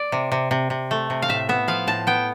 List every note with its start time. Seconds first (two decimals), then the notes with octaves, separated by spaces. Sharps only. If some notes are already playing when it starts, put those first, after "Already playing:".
Already playing: D5
0.12 C3
0.32 C3
0.51 C3
0.70 C3
0.91 A3
1.10 C3
1.22 F5
1.28 A2 E5
1.49 B3 E5
1.68 F3 F5
1.87 A2 A5
2.07 B3 G5